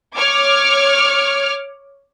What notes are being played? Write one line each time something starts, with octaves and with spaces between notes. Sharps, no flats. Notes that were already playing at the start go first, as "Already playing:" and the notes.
C#5 D6 F6 G#6